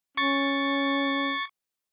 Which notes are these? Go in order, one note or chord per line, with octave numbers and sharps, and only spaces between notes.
C#4 C#6 A6